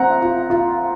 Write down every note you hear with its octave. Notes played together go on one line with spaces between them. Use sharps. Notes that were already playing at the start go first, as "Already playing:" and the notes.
Already playing: C4 F4 F#5 A#5
F4
F4